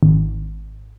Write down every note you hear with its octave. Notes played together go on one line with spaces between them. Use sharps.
G#1